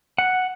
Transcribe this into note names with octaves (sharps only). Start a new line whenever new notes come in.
F#5